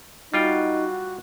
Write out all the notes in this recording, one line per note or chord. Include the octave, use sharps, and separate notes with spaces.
G3 D#4 F4 F#4 G5